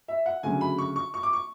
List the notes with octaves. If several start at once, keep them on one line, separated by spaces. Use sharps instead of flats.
E5
F#5
D2 C#3 F#3 G#5
B5
C#6
C#6
C#6
D6
C#6